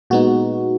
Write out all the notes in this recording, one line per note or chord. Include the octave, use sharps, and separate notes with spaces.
A#2 G#3 B3 D#4 F#4